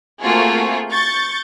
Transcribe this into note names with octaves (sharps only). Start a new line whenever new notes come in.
A3 A#3 C4 F4 F#4 G#4
C#6 G6 A6